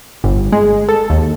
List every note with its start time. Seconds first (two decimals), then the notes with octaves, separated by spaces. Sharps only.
0.24 G1
0.52 G#3
0.89 A4
1.10 D#2